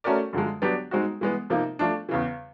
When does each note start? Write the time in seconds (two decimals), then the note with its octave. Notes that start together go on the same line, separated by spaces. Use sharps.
0.04 A3 C#4 F#4 A#4 D5
0.33 F#2 D3 F3 G#3
0.62 F#3 B3 D4 G4
0.91 G#3 C4 D#4 F#4
1.21 E3 G#3 B3
1.50 C3 F3 A#3 D#4
1.79 F3 A3 D4
2.09 E2 C#3 E3